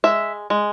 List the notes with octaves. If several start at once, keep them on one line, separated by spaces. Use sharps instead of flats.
G#3 E5
G#3